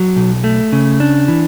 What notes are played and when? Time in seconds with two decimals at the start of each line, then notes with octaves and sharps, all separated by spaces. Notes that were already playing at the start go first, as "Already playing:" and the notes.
Already playing: F#3
0.16 B1
0.44 A3
0.72 C#3
1.00 D4
1.28 E3